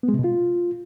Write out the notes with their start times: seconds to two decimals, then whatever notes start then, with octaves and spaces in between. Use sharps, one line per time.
0.03 B3
0.09 G#3
0.14 C3
0.19 B2
0.24 F4